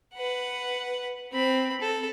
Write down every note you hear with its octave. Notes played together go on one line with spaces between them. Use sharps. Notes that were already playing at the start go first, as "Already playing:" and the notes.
B4 F#5
C4 B5
A4